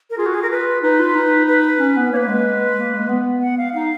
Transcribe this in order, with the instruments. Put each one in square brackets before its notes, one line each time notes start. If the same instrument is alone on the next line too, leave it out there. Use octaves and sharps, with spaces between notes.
[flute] A#4
[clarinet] F4 [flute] G#4
[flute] F#4
G#4
A#4
B4
[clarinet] D#4 [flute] B4
[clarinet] F4
D#4
[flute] B4
[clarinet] C#4
B3
[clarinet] A#3 [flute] C#5
[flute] B4
[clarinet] G#3
A#3
G#3
B3
[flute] F#5
F5
[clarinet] D#4 [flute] F5